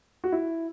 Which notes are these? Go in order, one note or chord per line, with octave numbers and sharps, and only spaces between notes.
F#4
E4